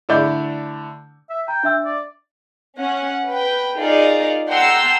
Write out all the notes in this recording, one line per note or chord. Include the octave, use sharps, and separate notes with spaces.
D3 A3 E4 D5 G6
E5
G5 A#5
D4 E5 E6
D5
C#4 F#5
B4 G5
D#4 F4 G#4 A#4 D5
F#5 G5 A5 A#5 C6 E6